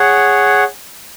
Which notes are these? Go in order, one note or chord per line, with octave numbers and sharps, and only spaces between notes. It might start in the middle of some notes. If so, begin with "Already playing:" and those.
Already playing: G#4 C#5 F#5